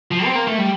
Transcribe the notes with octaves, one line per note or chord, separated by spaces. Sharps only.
F3
C4
A#3
A3
G3